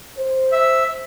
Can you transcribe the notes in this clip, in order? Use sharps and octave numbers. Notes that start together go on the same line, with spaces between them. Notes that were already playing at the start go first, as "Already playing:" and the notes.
C5
E5